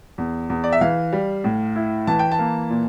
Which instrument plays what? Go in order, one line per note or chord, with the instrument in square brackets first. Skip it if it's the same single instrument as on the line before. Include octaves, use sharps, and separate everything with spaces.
[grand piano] E2
E2
D5
E5
E3 F5
G3
A2
E4
E3 A5
G5
A5
A#3
A#2